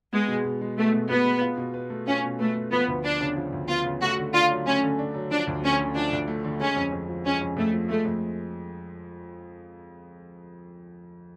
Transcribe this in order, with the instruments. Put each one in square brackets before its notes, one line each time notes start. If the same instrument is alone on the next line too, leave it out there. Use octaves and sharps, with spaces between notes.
[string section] G#3 [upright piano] B3
[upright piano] B2
B2
G#3
[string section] A3 [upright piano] B3
[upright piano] B2
[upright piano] B2 [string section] B3
[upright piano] G#3
F4
B2
B4
A3
[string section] C#4 [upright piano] F4
[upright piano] B2
[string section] A3 [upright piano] B4
[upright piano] A3
[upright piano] F3 [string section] B3
[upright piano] D2
[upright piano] B3 [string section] D4
[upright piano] C#3
F3
D2
[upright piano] B3 [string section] F4
[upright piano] C#3
[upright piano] A3 [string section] F#4
[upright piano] D3
[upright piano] D4 [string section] F4
[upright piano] F#3
[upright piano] A3 [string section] C#4
[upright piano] D3
D4
F#3
[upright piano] F3 [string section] D4
[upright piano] D2
[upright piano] A3 [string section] C#4
[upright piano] D3
[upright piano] F3 [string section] D4
[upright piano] D2
A3
D3
[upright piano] G#3 [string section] C#4
[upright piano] F2
F2
F3
[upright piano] G#3 [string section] C#4
[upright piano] F2
[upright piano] F2 [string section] A3
[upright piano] F3
[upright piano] G#3 [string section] A3
[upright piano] F2